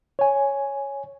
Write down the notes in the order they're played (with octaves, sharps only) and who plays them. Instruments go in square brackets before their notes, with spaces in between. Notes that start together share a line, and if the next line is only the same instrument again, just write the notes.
[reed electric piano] C#5 G#5